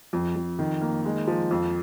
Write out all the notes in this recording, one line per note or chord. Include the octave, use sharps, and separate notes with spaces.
F2
F2
D#3
A#3
G#3
F3
F2